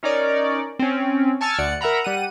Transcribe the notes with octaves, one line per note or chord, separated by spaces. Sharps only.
C#4 D#4 A#4 C#5 D5
C4 C#4
G#5 A5 C#6 E6 F6 A6
D2 D5 F#5 C#7
A#4 E5 F#5 A#5 B5
G3 F#5 D#7